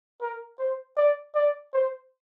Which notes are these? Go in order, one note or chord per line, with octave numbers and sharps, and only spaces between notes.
A#4
C5
D5
D5
C5